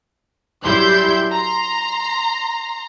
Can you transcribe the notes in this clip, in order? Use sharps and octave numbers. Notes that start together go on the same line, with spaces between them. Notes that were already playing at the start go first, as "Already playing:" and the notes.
F#2 G3 E4 C6 G6
A#5 C6